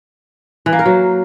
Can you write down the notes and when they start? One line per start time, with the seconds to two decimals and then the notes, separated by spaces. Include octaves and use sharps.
0.66 E3
0.73 A#3
0.79 A#4
0.86 F#3